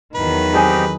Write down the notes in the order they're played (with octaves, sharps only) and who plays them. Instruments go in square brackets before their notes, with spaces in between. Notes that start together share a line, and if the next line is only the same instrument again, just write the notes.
[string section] E2 D#3 F#3 [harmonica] B4
[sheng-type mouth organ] C4 D#4 G4 [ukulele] G#4 G#5